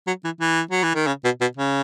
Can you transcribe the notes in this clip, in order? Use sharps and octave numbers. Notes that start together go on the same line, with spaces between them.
F#3
E3
E3
F#3
E3
D#3
C#3
B2
B2
C#3